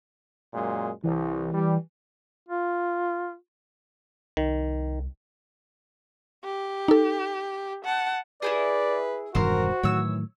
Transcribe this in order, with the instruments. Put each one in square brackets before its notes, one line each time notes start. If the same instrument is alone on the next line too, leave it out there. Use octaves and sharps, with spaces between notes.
[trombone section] F#2 A#2 G#3
[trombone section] C2 [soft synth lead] E3
[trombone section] G3
[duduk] F4
[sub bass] C2 [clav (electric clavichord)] D#3
[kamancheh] G4
[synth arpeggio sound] D#4 A4
[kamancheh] F#5 A5
[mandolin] E4 G4 G#4 [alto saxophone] B4 [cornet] D5
[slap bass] E1 G2 D#3 [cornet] F#4 [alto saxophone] A#4 [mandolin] C5
[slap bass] A2 D#3 F#3 [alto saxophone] E3 [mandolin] C#5 E6